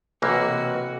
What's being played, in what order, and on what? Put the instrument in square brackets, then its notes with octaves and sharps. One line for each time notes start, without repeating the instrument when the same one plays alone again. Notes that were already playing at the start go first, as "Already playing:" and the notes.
[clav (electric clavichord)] B1 E3 A#3 [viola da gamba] C3 F#4